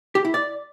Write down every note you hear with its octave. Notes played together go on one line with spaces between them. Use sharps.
G4
E4
D5